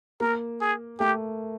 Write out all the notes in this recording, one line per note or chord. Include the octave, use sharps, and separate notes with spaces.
A#3 A#4
G#4
A3 G4